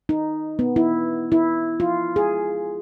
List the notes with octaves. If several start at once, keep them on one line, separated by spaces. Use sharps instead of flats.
D#4
B3
E4
E4
F4
G#4